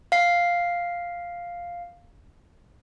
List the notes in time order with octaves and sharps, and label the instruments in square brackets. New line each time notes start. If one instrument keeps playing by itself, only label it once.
[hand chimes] F5 C7